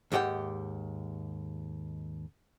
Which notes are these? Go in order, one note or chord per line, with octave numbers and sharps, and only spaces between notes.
D#2 G#2 G4 F#5 G5